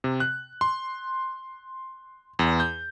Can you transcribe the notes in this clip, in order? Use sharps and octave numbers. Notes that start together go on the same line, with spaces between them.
C3
F#6
C6
E2
G6